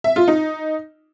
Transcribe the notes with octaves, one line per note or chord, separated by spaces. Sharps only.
E5
F4
D#4